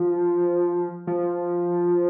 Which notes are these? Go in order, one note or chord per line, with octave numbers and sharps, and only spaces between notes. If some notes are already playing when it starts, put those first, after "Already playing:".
Already playing: F3
F3